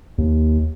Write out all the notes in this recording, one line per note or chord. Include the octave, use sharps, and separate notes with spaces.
D#2